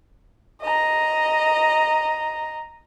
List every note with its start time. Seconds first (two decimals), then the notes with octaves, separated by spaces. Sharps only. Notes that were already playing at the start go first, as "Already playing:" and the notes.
0.62 D#5 A#5